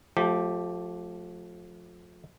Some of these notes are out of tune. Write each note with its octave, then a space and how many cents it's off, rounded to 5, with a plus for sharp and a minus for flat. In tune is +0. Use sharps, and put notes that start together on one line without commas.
F3 +25 A3 -15 G4 +0